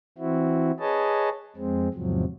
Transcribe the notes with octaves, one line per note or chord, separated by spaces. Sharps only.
E3 C4 E4 F#4
G#4 B4 C#5 D#5 A5
F2 G#3 C4
E2 G#2 C3 F3 F#3